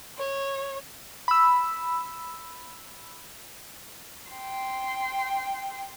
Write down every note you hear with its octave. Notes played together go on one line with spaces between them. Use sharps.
C#5
B5 E6
G5 C6